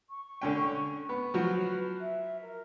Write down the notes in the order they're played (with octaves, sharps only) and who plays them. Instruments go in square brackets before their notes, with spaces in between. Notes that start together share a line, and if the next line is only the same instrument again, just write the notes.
[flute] C#6
[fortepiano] D3 C#4 G5
B3
[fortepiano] F3 F#3 F#4 [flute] B4
[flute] E5
A#4